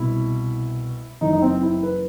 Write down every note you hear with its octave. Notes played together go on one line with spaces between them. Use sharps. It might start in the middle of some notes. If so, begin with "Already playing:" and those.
Already playing: C2 B2 E4
F#1 F#2 E3 D#4
D#4
C4
E4
B4